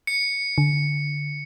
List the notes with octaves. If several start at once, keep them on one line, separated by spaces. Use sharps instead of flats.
C#7
D3